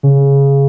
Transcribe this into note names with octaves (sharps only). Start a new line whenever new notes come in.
C#3